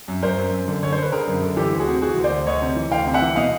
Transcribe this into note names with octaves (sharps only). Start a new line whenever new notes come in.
F#2
F#2 A#4 C5
F#2
F#2
D3
D3 C#5
C5
D3 B4
D3 G#4 A#4
F#2
D3
E3 G4 A4
D2
F#4 G#4
C3
E3 F#4 G#4
D2
C5 D5
D2
D2 C#5 D#5
C3
E3
D2 F5 G5
C3
E5 F#5
E3
B2 D#5 F5